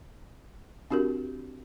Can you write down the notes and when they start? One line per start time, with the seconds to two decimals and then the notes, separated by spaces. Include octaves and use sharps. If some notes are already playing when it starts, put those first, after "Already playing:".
0.90 C4 D4 F#4 G4 A#4